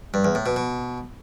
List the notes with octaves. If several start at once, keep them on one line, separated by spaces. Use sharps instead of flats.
G2
E2
A2
B2
B2